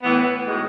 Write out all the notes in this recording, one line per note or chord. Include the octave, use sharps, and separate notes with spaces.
A2 E3 B3
A2 G#3 D#4 F#4